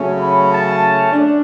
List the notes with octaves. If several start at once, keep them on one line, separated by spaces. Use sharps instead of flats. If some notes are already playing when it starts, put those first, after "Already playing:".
Already playing: C#3 F#3 A3 C#4
B5
A5
D4